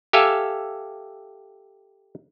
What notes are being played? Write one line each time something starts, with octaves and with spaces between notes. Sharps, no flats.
G4 A4 E5 F5 G#5